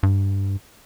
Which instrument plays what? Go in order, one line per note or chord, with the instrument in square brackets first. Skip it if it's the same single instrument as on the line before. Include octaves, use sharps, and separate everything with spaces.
[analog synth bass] G2